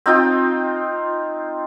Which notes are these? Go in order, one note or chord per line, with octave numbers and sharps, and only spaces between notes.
C4 D#4 F4 G5